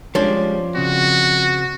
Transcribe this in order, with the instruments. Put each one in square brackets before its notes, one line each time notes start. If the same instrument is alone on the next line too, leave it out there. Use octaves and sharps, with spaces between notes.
[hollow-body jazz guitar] F3 C#4 D4 [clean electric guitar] G3 G#3
[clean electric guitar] C#3 C4 [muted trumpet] F#4